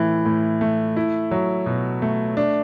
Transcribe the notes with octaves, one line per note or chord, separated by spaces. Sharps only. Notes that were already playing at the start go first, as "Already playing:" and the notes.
Already playing: A2 E3
A2
A3
E4
F#3
B2
A3
D4